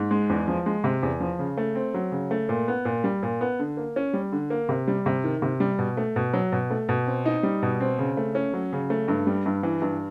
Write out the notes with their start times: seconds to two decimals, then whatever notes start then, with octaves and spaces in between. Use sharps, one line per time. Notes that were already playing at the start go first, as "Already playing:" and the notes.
Already playing: G#2
0.11 G#3
0.30 E2
0.48 F3
0.66 G#3
0.84 C3
1.03 E2
1.20 F3
1.39 C#3
1.57 A3
1.75 C4
1.94 F#3
2.12 C#3
2.31 A3
2.49 A#2
2.68 B3
2.85 A#2
3.04 G3
3.23 A#2
3.41 B3
3.59 D3
3.77 A#3
3.96 C#4
4.14 G3
4.32 D3
4.50 A#3
4.69 C3
4.88 G3
5.06 C3
5.24 D#3
5.42 C3
5.60 G3
5.78 B2
5.97 A3
6.16 B2
6.33 F#3
6.52 B2
6.70 A3
6.89 B2
7.07 C4
7.26 D#4
7.43 G3
7.62 B2
7.80 C4
7.99 C#3
8.17 A3
8.35 C#4
8.54 F#3
8.73 C#3
8.90 A3
9.08 G2
9.27 G3
9.46 G2
9.63 E3
9.82 G2